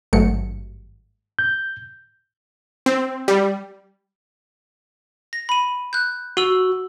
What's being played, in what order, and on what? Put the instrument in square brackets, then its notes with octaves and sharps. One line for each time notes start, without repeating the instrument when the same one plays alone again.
[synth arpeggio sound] G#1 G2 F#3 A3 C#7
[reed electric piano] G6
[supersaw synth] C4
G3
[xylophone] A#6
B5 D#7
F#6 G6
[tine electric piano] F#4 [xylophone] E6 F#7 G7